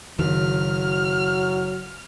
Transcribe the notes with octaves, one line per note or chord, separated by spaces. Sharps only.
F#1 D#3 F#3 F6